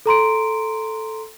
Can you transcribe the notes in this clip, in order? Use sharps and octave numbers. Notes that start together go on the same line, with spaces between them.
A4 A#5 C6 D7